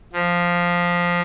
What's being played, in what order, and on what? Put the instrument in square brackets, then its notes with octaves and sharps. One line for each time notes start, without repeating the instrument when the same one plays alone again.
[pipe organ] F3